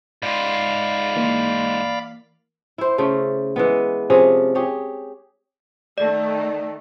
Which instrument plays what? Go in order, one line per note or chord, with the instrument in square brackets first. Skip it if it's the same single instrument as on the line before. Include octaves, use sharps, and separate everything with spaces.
[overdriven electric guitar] G#2 F4 [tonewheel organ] D5 F5 B5
[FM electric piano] E3 A#3
[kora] E4 C5
C#3 A3 C5
E3 G#3 B3
C3 F3 C#4 G#4
G4 G#4 C#5
[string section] D#3 A3 [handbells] D5